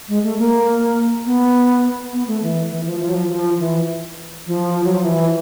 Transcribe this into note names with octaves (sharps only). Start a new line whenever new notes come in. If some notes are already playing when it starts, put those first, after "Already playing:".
G#3
A3
A#3
B3
B3
A3
E3
E3
F3
F3
F#3
F3
F3
E3
F3
F#3
F3
E3